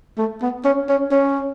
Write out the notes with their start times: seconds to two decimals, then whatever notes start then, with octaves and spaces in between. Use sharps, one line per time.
0.18 A3
0.42 B3
0.65 C#4
0.89 C#4
1.11 C#4